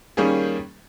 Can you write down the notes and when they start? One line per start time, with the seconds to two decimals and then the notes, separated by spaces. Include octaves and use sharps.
0.17 D#3 G3 A#3 C#4 G#4